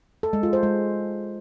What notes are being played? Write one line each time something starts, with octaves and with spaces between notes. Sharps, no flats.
A4
G#3
F4
C5
G#3